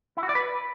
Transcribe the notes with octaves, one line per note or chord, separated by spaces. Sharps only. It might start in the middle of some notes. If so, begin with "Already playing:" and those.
E4
F#4
D5
B4